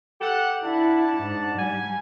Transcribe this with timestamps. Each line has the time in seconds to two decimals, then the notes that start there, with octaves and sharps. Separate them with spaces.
0.20 G4 A4 F#5
0.64 D4 E4 F#5 A5
1.18 G#2
1.57 G3 G#5